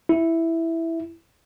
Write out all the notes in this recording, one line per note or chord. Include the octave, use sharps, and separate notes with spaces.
E4